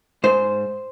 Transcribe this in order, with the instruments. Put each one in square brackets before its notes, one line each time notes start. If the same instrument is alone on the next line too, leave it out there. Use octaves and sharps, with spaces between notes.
[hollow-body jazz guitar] G#2 C5